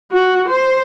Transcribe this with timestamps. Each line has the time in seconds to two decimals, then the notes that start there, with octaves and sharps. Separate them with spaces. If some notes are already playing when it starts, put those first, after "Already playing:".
0.12 F#4
0.48 C5